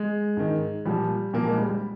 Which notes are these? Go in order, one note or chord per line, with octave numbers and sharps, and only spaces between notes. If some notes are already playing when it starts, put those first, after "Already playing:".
Already playing: G#3
G#2 D#3
A#2 F3 G3
A#2 F3 A#3
G#3
G3
G3